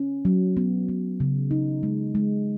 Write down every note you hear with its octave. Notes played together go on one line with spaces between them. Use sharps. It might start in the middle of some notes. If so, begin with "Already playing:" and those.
Already playing: C#4
F#3
B3
B3
C#3
D#4
G#3
G#3